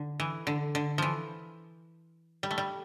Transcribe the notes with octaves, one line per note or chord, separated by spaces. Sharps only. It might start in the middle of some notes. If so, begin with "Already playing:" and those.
Already playing: D3
E3
D3
D3
E3 F3
G3
A3
G3